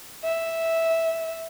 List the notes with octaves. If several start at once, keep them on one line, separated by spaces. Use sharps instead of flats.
E5